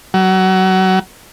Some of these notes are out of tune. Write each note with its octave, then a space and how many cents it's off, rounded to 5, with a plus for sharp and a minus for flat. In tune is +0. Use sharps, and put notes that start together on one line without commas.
F#3 +25